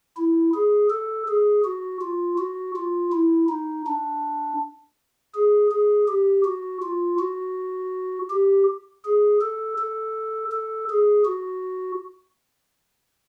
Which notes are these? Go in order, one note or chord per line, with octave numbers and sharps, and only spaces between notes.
E4
G#4
A4
G#4
F#4
F4
F#4
F4
E4
D#4
D4
G#4
G#4
G4
F#4
F4
F#4
G4
G#4
A4
A4
A4
G#4
F#4